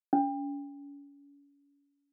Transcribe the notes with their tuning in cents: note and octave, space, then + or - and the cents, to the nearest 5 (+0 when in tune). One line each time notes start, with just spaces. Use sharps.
C#4 +35